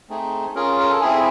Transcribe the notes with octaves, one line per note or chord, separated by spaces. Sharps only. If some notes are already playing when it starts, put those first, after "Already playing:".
A3 C4 D#4 G#4
C#4 F4 G#4 A#4
A#4
A4
C4 E4 G#4